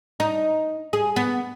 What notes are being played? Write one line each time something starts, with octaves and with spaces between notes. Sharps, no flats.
D#4
G#4
B3